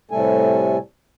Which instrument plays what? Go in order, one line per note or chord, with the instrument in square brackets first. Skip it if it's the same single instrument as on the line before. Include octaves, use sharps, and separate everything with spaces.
[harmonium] A2 C3 G3 A3 A4 G#5